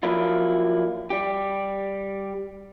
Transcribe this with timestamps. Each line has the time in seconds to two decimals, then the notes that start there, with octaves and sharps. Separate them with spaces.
0.03 F3 F#3 A#3 E4 F4
1.10 G3 G4